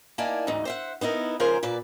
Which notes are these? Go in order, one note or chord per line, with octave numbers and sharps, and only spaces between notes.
A#3 D#4 E4 D5 G#5 A5
D2 G#2 E3 D#4
C5 E5 F#5
B3 D#4 E4 A#4
G#2 C#3 F3 A#4 C5 G#5
A#2 A#3 B4 D5